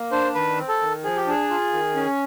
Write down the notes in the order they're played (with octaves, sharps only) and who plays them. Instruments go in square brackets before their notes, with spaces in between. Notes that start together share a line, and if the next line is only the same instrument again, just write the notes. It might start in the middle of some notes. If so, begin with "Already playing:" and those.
Already playing: [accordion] A#3
[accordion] D4 [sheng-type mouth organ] C5
[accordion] D#3 [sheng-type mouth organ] B4
[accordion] C4
[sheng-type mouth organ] A4
[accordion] D#3
[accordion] F3 [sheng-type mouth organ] G#4
[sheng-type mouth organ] G4
[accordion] D4 [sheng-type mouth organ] G#4
[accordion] F4
D#3
C#4